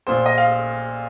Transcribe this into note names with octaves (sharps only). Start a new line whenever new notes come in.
A#1 A#2 C5
D#5
F5